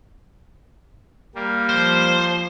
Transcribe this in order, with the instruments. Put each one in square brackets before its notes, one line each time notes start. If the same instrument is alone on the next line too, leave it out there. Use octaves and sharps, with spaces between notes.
[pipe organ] G3 A#3
[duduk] F3 [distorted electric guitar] C5